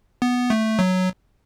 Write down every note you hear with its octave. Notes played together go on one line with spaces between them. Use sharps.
B3
A3
F#3